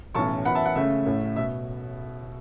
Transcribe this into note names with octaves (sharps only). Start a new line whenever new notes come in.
B1 A2 E3 C#4 A5 C#6
F#2 E3 B3 F#5 B5
E5 A5
F#5
C#2 C#3 A3 C#4 E5
A1 A2 A3 C#4
B2 E5